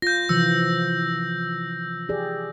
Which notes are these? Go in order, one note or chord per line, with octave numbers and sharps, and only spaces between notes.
F4 G6 A#6
C3 E3 F3 E6
G4 G#4 D5